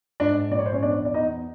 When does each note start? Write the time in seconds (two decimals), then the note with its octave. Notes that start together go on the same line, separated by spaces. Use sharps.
0.20 G#2 D4 D5
0.51 A#1 D5
0.59 C#5
0.66 C5
0.73 C#4 C#5
0.82 E2 D4 D5
1.05 D5
1.14 E2 D#4 D#5